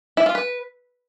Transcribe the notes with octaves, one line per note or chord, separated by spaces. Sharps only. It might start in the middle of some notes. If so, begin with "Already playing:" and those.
E4
F4
B4